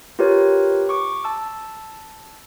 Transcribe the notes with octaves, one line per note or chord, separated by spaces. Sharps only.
F4 G4 A#4 B4 C#5
C#6 D6
A5 E6